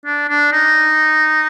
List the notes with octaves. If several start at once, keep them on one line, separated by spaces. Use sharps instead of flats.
D4
D4
D#4